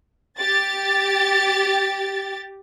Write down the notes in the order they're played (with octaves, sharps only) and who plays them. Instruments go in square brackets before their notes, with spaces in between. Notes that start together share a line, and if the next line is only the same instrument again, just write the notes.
[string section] G4 A6